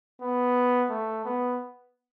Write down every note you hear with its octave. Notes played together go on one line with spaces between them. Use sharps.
B3
A3
B3